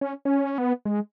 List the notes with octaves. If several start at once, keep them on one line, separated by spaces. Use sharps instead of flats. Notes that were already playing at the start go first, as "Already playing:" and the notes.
C#4
C#4
B3
G#3